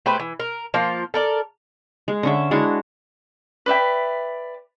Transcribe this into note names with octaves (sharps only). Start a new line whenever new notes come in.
A3 G4 B4 C5
E3
A#4
F3 A#3 F4
A4 A#4 D5
G#3
D3 C#4 E5
G#3 D4 E4 F#4
B4 D5 E5 G5